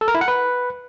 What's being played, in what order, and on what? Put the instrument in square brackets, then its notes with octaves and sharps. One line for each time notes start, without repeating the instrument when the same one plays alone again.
[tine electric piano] A4
A#4
E4
F#5
B4